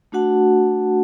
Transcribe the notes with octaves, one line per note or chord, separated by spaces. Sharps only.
A3 D4 F#4 F#5 A5